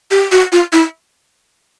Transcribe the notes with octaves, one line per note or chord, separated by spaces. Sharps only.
G4
F#4
F4
E4